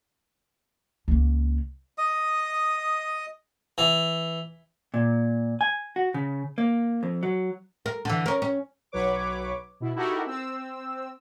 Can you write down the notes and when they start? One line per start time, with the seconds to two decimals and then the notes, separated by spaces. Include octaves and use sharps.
1.08 C#2 A#3
1.98 D#5 D#6
3.78 E3
4.94 A#2
5.61 G#5
5.96 F#4
6.14 C#3
6.58 A#3
7.03 F2
7.23 F#3
7.86 A#4
8.05 D3 E3
8.26 C#4 A#4
8.42 C#4
8.92 B1 F#3 B4 C#5 D6
9.80 B2 E4
9.95 D#4 E4 F#4 G4 A4 A#4
10.26 C4 E6